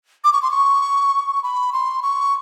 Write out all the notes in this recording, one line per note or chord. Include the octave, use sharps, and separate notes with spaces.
D6
C#6
C6
C#6
B5
C6
C#6